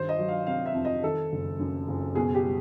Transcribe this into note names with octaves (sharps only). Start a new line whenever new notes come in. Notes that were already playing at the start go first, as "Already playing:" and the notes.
Already playing: G2 D#3 C5
D#5
F#3
F5
C3 F5
E5
F2
D#5
D#3 A4
F#1
F#2
F#1
B2 G#4
G4
G3